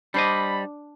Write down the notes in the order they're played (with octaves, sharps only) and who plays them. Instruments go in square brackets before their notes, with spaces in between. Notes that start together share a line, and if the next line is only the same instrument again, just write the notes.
[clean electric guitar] G3 C5 D#5 [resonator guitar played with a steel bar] D4 [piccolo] B5